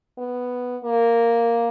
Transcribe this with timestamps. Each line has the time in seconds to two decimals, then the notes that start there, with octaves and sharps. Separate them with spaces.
0.18 B3
0.84 A#3